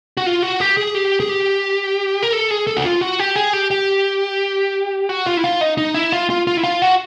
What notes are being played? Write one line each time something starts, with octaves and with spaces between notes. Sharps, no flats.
F#4
F4
F#4
G4
G#4
G4
G#4
G4
A#4
A4
G#4
A4
F#4
F4
F#4
G4
G#4
G4
G4
F#4
F4
E4
F4
D#4
D#4
E4
F4
F4
F4
E4
F4
F#4